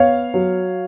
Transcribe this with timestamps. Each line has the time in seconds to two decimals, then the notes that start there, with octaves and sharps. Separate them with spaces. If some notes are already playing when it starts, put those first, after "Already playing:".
Already playing: B3 C#5 F5
0.34 F#3